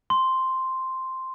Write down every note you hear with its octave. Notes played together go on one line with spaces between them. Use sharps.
C6